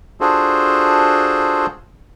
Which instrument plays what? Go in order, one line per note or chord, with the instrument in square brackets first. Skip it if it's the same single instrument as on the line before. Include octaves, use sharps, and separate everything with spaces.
[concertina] D4 F4 F#4 G#4 A4 C5